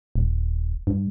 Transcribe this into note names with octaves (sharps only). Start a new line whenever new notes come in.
D#1
G2